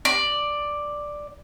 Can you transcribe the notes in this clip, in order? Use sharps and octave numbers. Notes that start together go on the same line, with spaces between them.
D5